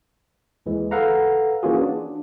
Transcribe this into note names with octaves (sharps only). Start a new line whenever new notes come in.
D#2 E3 G#3
A4 B4 F5 F#5 A#5
E3 A#3 C#4 F4 F#4 G#4
D4